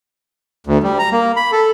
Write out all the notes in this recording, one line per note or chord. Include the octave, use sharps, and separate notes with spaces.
D2
G3
A#5
A#3
B5
A4